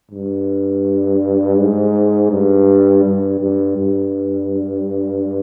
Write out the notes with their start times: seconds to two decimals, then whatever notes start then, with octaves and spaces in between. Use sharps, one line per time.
0.11 G2
1.58 G#2
2.30 G2
3.04 G2
3.40 G2
3.77 G2